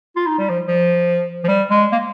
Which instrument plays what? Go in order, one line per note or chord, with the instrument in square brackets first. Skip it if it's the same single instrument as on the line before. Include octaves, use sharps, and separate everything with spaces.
[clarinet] F4
D#4
G3
F3
F3
F3
G3
G#3
A#3